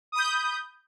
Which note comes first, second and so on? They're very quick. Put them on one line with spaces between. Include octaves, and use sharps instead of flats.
D#6 B5 G6